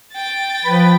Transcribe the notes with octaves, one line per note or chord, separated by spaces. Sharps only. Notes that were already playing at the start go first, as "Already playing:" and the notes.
G5 A6
F3 B4 B5